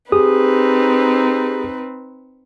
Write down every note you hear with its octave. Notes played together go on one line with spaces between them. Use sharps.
C4 D#4 G4 G#4 B4 D#6